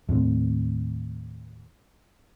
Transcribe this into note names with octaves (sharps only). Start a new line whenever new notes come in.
D#2 A2 C4